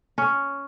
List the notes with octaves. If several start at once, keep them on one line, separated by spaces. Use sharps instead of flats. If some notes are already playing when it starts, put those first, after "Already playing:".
C#4